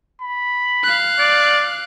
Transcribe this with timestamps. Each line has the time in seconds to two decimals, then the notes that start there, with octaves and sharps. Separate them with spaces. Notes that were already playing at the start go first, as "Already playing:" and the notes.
0.21 B5
0.84 F5 F#6
1.20 D5